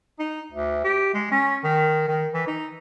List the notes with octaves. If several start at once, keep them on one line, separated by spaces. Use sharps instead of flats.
D#4
D2
G4
G#3
C#4
D#3
D#3
E3
D#4